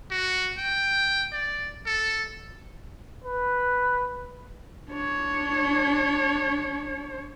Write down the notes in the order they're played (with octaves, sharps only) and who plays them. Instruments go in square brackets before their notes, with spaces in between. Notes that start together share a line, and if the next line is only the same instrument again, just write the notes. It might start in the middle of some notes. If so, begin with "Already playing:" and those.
[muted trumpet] F#4
G5
D5
A4
[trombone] B4
[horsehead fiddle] D4 C#5